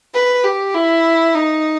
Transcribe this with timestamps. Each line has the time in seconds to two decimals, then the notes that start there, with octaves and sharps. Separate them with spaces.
0.14 B4
0.44 G4
0.74 E4
1.35 D#4